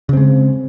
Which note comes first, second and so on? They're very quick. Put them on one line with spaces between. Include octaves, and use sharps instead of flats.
C#3 C4 G#3